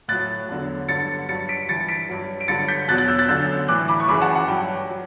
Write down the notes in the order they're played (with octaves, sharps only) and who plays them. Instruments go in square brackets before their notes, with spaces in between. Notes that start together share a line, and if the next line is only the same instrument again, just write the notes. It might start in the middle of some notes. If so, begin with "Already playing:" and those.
[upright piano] A2 F#3 F#6 A6
E2 D3 F#3
G2 D3 F#3 A6 C#7
G2 F#3 A6 C#7
B6 D7
G2 E3 A6 C#7
B6 D7
G2 F#3
D7
G2 D3 F#3 A6 C#7
G6 B6
E2 B2 F#3 F#6 A6
F#6 A6
E6 G6
F#6 A6
F#2 D3 F#3 E6 G6
A2 E3 D6 F#6
B5 D6
C#6
F#2 C#3 E3 B5 D6
F#5 A5
F#5
G2 F#3 G5
F#3